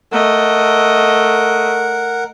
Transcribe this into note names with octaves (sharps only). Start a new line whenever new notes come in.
A3 A#4 D#5 F#5